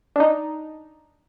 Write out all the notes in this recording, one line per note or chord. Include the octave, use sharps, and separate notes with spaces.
D4 D#4